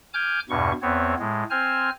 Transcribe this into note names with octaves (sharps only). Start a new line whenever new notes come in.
G#5 D6 F6 G6
E2 G2 B2 C#6
E2 B3 C4 C#5
A2 G#3
C4 C5 G#5 F6